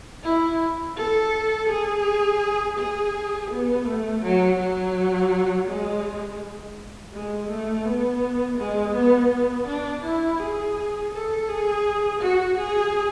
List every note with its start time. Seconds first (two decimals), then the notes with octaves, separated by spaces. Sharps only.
0.23 E4
0.97 A4
1.69 G#4
2.78 G#4
3.51 B3
3.86 A3
4.23 F#3
4.59 F#3
5.68 G#3
7.13 G#3
7.50 A3
7.85 B3
8.58 G#3
8.94 B3
9.31 B3
9.67 D4
10.04 E4
10.39 G#4
11.13 A4
11.48 G#4
12.21 F#4
12.58 G#4